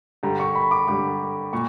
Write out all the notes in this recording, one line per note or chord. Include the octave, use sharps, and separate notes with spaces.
G2 D3 G3 A#5
C#6
B5
D6
G2 D3 G3 D6
A#2 C#6